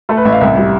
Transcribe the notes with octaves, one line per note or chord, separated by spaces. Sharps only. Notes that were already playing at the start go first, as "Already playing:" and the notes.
A3 A4
B4
A1 E5
F5
C2 E5
G3